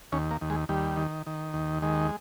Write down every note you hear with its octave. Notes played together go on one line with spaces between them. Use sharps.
D#2 C#4
A#3
D#2
G#3
D#2 G3
D#3
D#3
D#2
D#3 G#3